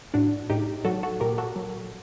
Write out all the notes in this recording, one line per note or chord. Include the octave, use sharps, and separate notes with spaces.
A2 D4 F#4
A2 D#4 G4
F#3 F#4 A4
F#4 A4
A#2 G4 A#4
F#4 A4
F#3